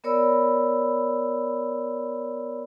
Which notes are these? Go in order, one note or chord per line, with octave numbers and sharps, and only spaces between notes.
B3 A#4 C#5 D5 B5 E6